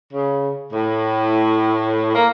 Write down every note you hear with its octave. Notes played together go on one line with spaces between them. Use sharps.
C#3
A2
A#3